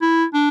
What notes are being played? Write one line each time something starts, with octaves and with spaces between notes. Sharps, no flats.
E4
D4